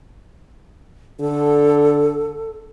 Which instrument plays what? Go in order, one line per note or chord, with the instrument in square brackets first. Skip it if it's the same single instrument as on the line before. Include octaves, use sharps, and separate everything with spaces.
[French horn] D3 [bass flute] A4